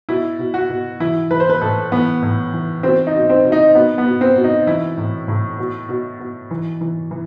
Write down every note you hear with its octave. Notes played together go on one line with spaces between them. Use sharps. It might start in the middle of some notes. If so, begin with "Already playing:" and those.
B2 E4
B2
F#4
B2
E3 E4
E3 B4
C5
B4
A2 A4
E3 B3
A2
E3
B2 C4
D#4
B2
C4
B2
D#4
B2 B3
B3
B2
C4
B2
D#4
E3 E4
A2
A2
B2
B2
B2
E3
E3
E3